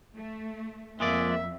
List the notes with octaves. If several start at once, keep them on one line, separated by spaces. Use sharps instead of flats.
A3
F2 G#3 A#3 G#4 D5 E5